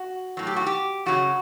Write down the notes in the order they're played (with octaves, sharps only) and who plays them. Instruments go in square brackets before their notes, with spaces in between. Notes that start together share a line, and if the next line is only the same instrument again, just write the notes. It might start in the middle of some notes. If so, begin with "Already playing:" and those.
Already playing: [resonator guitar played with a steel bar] F#4
A2 F#3
G4
F#4
G4
F#2 C#3 F#3 F#4